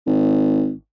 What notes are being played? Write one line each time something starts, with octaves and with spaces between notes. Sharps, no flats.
G#1